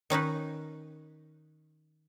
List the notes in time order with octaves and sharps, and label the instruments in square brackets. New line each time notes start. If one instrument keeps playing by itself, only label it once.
[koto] D#3 C#4 D#4 B4